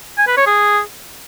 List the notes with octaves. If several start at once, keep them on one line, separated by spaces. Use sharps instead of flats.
G#5
B4
C#5
G#4